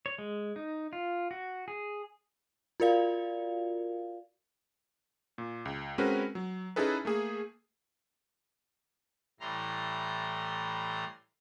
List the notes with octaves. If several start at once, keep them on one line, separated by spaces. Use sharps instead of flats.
C#5
G#3
D#4
F4
F#4
G#4
F4 F#4 A#4 D5 F5
A#2
C#2
G#3 C4 C#4 F#4 A#4 B4
F#3
C#4 D#4 E4 G#4 A4 B4
A3 A#3 G#4
A2 E3 G3 A#5 C6